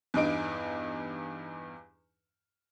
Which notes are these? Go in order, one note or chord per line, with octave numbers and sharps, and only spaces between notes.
E2 G2 D#4 D7